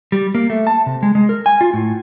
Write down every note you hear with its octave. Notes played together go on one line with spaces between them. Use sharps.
G3
A#3
A3
A5
C3
G#3
G#3
A#4
G#5
F4
A2